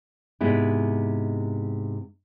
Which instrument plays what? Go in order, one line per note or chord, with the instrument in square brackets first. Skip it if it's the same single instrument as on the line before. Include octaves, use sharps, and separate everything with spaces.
[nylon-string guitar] G#2 C3 G#3 B3 E4